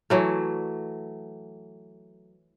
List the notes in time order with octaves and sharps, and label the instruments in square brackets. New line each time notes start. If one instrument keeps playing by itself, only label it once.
[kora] E3 F#3 A3